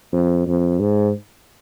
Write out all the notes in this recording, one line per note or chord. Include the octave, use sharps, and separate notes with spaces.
F2
F2
G#2